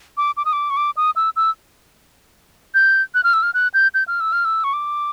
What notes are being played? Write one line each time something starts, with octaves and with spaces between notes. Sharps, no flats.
D6
D6
D#6
D6
C#6
D6
D#6
E6
E6
G6
F#6
F6
E6
F6
F#6
G6
G6
F6
E6
F6
E6
C#6
D6